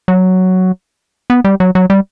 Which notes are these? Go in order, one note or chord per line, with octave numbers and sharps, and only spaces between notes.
F#3
B3
G3
F#3
F#3
G3